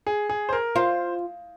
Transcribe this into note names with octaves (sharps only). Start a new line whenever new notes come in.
G#4
G#4
C5
A#4
F4 C5